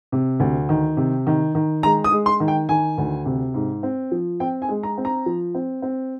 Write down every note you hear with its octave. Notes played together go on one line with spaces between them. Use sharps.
C3
D2
D#3
C3
D#3
D#3
G#3 A#5
D#6
G#3
C6
D#3
G5
D#3 G#5
D2
C3
G#2
C4
F3
C4 G5
G#5
G#3
A#5
C4
A#5
F3
C4
C4